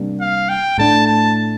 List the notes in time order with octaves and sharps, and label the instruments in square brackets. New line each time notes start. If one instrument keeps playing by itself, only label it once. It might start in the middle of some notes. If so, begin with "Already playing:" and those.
Already playing: [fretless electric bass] C3 G3 A#3 D4
[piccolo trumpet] F5
G5
[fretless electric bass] A2 A3 D4 [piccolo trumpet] A5
[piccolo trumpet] A5